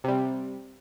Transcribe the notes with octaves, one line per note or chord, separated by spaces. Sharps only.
C3 G3